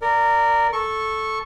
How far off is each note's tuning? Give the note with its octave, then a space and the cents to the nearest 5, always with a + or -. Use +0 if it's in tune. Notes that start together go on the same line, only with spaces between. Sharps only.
A#4 -15 D5 +0
A4 -5 C#6 -15